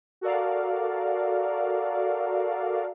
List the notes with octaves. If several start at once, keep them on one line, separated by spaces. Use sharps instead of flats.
F#4 A4 A#4 D5 F5